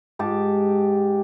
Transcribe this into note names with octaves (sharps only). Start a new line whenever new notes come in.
G#2 G4 A5